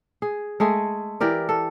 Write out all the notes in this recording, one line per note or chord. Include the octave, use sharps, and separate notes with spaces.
G#4
G#3 A3 G#4
E3 G4 A#4 D5
A4